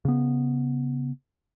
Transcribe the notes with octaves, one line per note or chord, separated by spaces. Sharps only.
C#3 B3